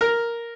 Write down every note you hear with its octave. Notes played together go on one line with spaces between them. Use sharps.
A#4